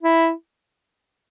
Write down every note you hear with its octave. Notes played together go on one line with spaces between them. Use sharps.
E4